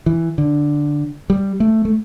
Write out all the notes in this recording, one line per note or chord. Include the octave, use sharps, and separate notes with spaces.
E3
D3
G3
A3
A3